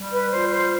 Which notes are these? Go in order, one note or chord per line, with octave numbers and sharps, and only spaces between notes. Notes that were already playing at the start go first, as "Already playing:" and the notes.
Already playing: G3
B4
F4 C5
C5